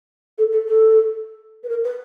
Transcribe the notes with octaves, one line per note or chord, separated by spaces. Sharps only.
A4
A4
A4
B4
A#4
B4